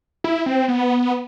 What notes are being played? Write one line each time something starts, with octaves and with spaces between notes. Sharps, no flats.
E4
E4
C4
C4
B3